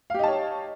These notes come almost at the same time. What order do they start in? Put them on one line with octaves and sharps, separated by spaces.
F5 G4 D#4 A5 C#5